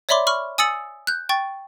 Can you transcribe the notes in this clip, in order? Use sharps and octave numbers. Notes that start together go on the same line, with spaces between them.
C#5 D5 E5 B5 C6 D6
B5 C#6 F6
G#5 D#6 E6 A6 C#7 F#7
F#6 G6
G5 C#6 A6